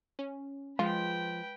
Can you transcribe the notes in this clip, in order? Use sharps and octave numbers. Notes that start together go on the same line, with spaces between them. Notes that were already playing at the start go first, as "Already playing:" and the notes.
C#4
F3 G#3 F4 B4 G5